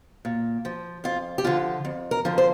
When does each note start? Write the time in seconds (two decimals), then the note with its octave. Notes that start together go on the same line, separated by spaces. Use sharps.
0.25 A#2
0.65 F3
1.04 F2 F4
1.38 G4
1.44 D3 F3 F4
1.85 F2
2.11 A#4
2.25 D3 F3
2.38 C5